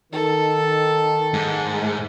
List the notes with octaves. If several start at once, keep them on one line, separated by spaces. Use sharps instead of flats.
D#3 A4
G#2